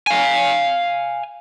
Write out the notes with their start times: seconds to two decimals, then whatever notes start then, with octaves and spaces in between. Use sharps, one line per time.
0.07 F5 G#5